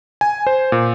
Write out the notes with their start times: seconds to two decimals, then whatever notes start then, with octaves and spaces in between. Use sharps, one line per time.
0.21 G#5
0.47 C5
0.72 A#2